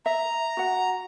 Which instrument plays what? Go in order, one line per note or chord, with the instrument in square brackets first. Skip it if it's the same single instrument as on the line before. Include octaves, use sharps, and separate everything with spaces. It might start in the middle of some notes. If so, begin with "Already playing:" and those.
[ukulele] E5 [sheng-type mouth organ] A#5
[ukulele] F#4 F#5